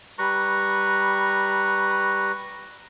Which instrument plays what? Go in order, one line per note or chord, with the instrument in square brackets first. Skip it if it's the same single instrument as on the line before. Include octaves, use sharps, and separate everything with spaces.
[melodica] G3 B4 A#5 C#6